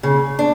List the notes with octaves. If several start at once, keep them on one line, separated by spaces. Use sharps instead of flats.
C#3
D4